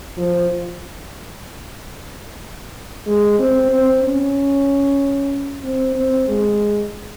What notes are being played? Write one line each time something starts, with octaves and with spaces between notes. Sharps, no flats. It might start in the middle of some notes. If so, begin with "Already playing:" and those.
F3
G#3
C4
C4
C#4
C4
C4
G#3